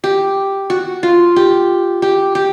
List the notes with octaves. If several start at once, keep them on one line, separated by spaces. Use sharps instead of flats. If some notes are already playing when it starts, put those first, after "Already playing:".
G4
F#4
F4
G4
G4
G4